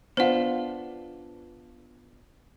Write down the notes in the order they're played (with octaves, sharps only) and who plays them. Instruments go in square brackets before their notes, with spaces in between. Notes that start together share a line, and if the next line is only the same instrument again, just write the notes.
[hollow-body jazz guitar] B3 D4 F4 [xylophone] C5 F#5